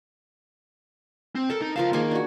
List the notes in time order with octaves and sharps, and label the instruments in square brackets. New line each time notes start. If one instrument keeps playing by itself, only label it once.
[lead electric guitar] C4
[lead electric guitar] A4 [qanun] A#4 A5
[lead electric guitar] D#4
[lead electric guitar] C#2 F5 [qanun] F3 A#4 A5
[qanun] D#3 G#4 G#5 [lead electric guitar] A#3
[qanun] D4 F#4